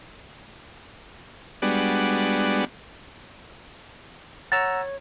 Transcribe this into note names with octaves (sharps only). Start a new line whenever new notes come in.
G3 G#3 B3 D4 F#4
C#5 F#5 A#5 E6 A6